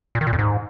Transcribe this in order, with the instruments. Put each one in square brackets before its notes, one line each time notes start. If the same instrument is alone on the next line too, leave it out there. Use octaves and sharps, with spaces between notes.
[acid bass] A#2
D#3
A#2
F2
G#2